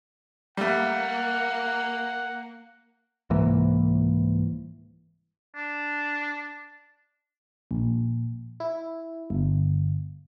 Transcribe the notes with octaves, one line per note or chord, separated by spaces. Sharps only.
G3 A3 A#3 F#5
C2 G#2 E3 A#3
D4
A#1
E4
G1